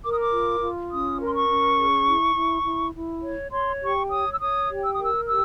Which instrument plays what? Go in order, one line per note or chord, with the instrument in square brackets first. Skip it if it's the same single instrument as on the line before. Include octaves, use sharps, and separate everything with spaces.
[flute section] A#4 D6
D#6
D6
F4
F4
C#4 D#6
A#4
C6
C#6
C#4
G#4
E4
E4
E4
E4
C#5
C#5 C6
G4 C#6
C#5 D#6
E6
C#5 D#6
G4
E6
D#6
A#4 E6
G4 E6